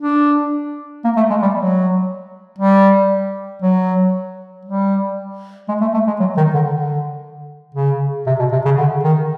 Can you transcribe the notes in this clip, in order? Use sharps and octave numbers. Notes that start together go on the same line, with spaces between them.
D4
A#3
A3
G#3
G3
F#3
G3
F#3
G3
G#3
A3
A3
G#3
F#3
D#3
D3
D3
C#3
C3
B2
C3
C#3
D3
D#3